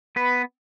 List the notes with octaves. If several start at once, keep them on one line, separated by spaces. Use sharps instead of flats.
B3 B4